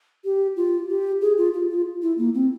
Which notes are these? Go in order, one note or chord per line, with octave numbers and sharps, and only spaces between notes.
G4
F4
G4
G#4
F4
F4
F4
E4
A#3
C4